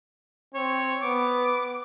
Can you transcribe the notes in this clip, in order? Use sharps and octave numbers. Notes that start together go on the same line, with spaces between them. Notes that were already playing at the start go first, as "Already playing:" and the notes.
C4 C#5
B3 D6